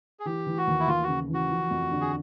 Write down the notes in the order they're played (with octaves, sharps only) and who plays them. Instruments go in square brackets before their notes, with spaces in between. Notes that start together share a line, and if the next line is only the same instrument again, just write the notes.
[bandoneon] G#4
[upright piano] E3 [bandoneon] G4
[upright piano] E3
[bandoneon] F#4
[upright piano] D#2
[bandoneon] E4
[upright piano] D#2 [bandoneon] F4
[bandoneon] F#4
[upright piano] C#3
[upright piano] E3 [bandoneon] F#4
[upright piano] F3
F2
D3
[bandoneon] G#4